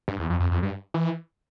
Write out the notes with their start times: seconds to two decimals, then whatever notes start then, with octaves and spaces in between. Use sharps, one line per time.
0.08 G2
0.19 E2
0.30 F2
0.40 F2
0.51 F2
0.63 G2
0.94 E3